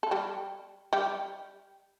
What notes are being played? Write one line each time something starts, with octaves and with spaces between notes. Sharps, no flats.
A4
G3 G4
G3 G4